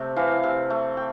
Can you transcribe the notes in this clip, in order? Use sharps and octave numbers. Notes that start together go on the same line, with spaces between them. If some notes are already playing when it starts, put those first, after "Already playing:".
Already playing: C3 A3 G5
E3 F5
C3
A3
G5